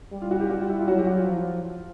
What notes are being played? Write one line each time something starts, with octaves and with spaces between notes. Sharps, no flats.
G3
F4
F#4
G4
G3 F#4
F4
E4
F4
F#3 F#4
G4
F#4
F4
F3